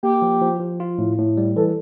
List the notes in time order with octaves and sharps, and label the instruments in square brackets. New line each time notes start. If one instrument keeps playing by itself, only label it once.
[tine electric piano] A#3 [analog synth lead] G4
[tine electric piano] F3
F3
F3
F4
A2
A2
G3
[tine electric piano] E3 [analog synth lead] A4